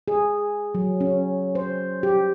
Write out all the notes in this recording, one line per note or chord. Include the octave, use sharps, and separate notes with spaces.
G#4
F#3
C#4
C5
G4